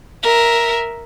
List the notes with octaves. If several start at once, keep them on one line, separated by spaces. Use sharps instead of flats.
A#4 E5